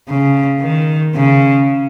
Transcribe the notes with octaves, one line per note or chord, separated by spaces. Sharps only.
C#3
D#3
C#3